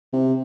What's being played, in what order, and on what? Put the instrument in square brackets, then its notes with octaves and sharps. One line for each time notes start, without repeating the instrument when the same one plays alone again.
[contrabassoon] C3